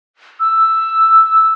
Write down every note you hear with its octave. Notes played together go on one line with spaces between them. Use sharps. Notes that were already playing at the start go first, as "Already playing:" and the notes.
E6